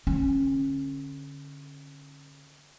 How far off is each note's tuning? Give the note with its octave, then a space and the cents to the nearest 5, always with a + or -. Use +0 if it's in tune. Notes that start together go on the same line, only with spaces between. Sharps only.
D3 -15 C#4 -25